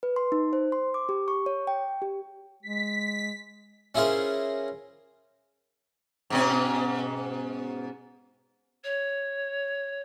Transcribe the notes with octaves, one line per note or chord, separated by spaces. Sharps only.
B4
C6
D#4
C5
C6
D6
G4
C#6
C#5
G5
G4
G#3 B6
C#4 E4 F4 G#4 A#4 C5
G#2 B2 C#4
C#5